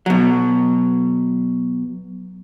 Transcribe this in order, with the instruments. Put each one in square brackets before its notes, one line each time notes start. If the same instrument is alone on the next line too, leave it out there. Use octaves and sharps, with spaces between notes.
[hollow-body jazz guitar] B2 F#3